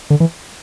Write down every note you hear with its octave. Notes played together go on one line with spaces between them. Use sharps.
D3
E3